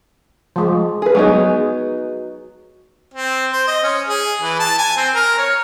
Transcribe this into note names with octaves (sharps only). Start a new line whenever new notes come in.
F3 G#3
G#4 B4
F#3 G#3 B3 D#4 G#4
C4
C5
D#5
C#4
G#4
E3
A5
G#5
C4
A#4
C#5